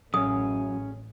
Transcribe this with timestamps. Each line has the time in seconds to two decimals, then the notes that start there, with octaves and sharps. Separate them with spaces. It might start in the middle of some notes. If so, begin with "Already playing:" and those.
0.14 A1 F#2 C#4 G#4 D#6